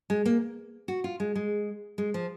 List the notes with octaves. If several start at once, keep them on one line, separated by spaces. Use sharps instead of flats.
G#3
A#3
F#4
F4
G#3
G#3
G#3
F3